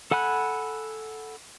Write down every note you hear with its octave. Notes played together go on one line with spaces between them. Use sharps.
A4 F#5 G#5 B5 F#6